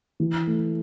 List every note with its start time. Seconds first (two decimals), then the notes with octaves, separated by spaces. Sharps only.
0.20 E3
0.47 A3